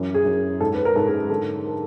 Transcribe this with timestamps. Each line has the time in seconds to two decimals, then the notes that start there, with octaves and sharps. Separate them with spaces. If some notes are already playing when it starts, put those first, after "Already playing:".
Already playing: F#2 E3
0.15 G#4
0.25 F#2
0.60 G#2 A4
0.75 B4
0.85 A#4
0.96 G#2 A4
1.07 G#4
1.30 D3 A4
1.64 A#4